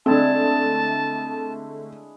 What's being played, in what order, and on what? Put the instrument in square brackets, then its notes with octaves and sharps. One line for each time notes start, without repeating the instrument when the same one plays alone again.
[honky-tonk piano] D3 A3 [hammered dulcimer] G#3 D4 E4 [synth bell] C4 [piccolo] A5